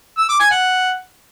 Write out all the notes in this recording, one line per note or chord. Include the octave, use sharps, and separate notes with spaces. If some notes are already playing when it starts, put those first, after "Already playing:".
E6
D6
G#5
F#5